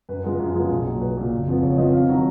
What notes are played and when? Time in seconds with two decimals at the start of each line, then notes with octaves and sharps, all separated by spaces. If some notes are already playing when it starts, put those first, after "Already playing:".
0.09 F#2 B4
0.24 F3 G#3 B3 A#4
0.40 F#2
0.55 F3 G#3 B3 G#4
0.70 B1
0.86 A#2 F#3
1.01 B1 B4
1.16 A#2 F#3
1.32 F#1
1.47 F2 F3 B3
1.62 F#1 C#5
1.78 F2 F3 B3 D#5
1.93 F2 F5
2.09 D#3 F#3